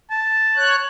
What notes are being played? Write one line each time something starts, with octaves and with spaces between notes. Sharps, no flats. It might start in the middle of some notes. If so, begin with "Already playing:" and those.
A5
C#5 F#6